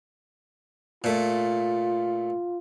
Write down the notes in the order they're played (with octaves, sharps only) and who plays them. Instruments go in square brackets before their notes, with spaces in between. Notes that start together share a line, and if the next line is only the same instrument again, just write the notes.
[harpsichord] A#2 A3 [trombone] F4